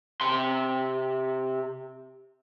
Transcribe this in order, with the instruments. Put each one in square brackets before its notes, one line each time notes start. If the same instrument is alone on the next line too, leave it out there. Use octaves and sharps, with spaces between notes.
[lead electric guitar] C3 C6